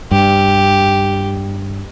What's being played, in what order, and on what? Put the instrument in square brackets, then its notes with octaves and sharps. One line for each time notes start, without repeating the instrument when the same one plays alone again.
[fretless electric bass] G2 [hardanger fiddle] G4